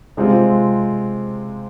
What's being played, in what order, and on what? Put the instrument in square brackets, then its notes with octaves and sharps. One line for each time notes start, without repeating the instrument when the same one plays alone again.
[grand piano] C3 G#3 C4 F4